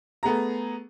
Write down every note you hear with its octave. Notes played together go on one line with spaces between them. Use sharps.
A3 B3 G#4 A#5